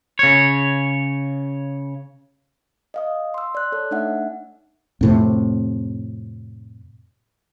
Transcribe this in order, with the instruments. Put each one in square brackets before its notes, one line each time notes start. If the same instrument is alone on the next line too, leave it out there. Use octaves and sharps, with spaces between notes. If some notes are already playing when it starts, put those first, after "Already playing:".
[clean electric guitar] C#3 C#5
[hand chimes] D#5 F5 D#6
C6 E6
D5 F#6
A4 C#5
A3 D4 D#4 E5 F#5
[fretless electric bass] F2 A2 C3